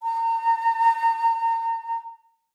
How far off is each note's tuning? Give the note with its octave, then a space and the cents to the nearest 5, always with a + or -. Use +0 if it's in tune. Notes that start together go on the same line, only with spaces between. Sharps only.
A#5 -35